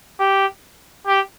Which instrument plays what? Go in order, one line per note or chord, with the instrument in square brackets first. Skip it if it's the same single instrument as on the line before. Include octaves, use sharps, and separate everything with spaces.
[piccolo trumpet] G4
G4